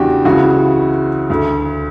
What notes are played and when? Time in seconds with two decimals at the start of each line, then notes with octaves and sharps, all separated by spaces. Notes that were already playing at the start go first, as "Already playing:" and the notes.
Already playing: E2 C#3 E3 D4 F#4 G4
0.25 C#2 C#3 E3 F#4
1.30 D2 D3